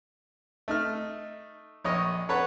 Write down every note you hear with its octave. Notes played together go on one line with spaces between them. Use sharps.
A3 D#4 F6
A#1 C#5 D#5
A4 B4 C#5 F#5